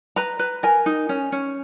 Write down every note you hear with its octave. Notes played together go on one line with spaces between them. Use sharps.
B4 A#5
B4
A#4 G#5
D#4
C#4
C#4